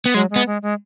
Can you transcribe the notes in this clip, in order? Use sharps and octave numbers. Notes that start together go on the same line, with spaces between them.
B3
F#3 G#3
G#3
B3
G#3
G#3